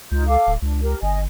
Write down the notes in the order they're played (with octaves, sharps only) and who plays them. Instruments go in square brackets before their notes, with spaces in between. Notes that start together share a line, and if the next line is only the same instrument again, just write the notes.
[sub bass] C#2 [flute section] D#4 F4 G6
[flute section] A4 F5 D6
[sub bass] D1
[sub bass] C#2 [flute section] D4
[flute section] G4 A#4
[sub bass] G1 [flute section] D#5 G#5